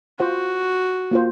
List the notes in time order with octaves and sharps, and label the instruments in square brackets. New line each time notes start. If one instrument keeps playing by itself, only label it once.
[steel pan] F4 C5 F#5 [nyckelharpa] F#4
[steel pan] A#3 F4 C5